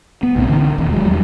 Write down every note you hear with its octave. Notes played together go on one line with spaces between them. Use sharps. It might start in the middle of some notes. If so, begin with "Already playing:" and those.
B3
B1 A2 D#3 C4
D3 E3 B3 D4
E1 D#2
F3 F#3 G#3
E2 G3